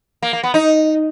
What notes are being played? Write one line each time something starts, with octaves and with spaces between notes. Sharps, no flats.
A#3
A#3
B3
D#4